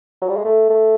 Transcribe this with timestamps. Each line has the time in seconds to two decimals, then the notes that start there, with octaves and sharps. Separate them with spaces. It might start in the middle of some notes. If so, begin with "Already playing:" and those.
0.22 F#3
0.29 G3
0.37 G#3
0.45 A3
0.70 A3